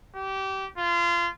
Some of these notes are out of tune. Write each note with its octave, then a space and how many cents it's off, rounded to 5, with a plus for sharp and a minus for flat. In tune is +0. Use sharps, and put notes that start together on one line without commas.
G4 -25
F4 -25